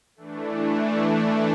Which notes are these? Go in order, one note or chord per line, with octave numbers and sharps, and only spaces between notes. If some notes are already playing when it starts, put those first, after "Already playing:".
E3 A3 D4